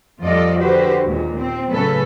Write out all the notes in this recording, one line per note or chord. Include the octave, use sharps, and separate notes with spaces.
F2 G3 F4 A4 D5 D#5
D3 F#4 G4 B4 C5
D#2 A#2 G#3
C4
A2 C#3 F#3 C#4 A4 B4